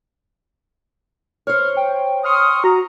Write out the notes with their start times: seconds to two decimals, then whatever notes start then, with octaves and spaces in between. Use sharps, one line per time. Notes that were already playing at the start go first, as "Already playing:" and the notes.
1.47 C5 C#5 F6
1.77 G5
2.24 C6 C#6 D#6 F6
2.64 F#4 A#5